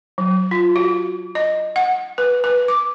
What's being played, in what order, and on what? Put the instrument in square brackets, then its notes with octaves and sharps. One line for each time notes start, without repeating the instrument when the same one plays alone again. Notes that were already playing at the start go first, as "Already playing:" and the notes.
[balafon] F#3
F4
F#4
D#5
F#5
B4
B4
D6